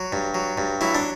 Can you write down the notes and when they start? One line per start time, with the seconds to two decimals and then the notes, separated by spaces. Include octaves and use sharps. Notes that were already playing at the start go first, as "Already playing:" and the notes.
Already playing: F#3
0.12 G2
0.34 F#3
0.58 G2
0.81 F#3 E4
0.95 D4